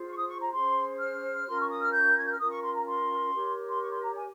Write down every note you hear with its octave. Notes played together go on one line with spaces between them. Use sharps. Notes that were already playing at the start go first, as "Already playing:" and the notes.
Already playing: F4 G#4 C5
C#6
D#6
C#6
A#5
C#4 G#4 C5 C6
F6
C#4 F4 A#4 C6
C#6
D#6
F6
G6
G#6
G6
F6
C#4 F4 A#4 D#6
C#6
C6
A#5
C6
G4 A#4 C#5
C6
C#6
C6
A#5
G#5